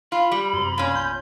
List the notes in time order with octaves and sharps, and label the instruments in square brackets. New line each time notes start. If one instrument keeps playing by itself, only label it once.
[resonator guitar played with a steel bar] F4 [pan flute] B5
[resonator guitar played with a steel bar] G3
[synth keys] F#2 C3
[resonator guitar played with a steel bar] A#2 C#4
[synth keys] B1 G6